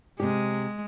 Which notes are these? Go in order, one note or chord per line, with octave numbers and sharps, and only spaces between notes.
C3 G#3 G4